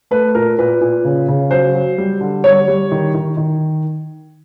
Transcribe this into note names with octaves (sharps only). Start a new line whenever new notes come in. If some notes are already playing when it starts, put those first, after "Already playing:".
A3 B4
A#2 A#4
A#2 B4
A#2
C#3
C#3
F#3 C5
F#3
G3
D3
G3 C#5
G3
D#3
D#3
D#3